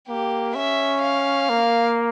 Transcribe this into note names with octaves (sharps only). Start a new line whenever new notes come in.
A#3 G4
C#4 E5
F5
A#3